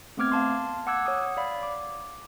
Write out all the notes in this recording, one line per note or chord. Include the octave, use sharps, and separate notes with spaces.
A3 B3 C4 D6 F6 G#6
F5 A5 C6
F#5 D6 E6 F#6 G#6
C#5 F#5 D#6
D5 F5 B5
D6